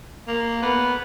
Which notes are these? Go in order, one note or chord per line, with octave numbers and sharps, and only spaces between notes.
A#3
B3